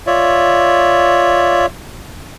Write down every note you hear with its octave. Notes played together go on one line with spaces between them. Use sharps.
F4 C#5 D5 E5